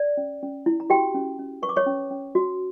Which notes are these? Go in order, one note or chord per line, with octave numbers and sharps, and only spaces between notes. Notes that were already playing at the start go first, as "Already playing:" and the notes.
Already playing: D5
C#4
C#4
E4
A#5
F#4 G4 G5
C#4
C#4
B4 C#6
D6
C#5 C#6
C#4
C#4
F#4